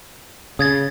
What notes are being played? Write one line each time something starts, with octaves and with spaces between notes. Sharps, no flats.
C#3 D#6 G#6 A6